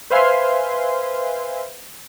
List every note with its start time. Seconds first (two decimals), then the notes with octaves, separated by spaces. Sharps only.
0.10 B4 C5 E5 F5 G#5 C6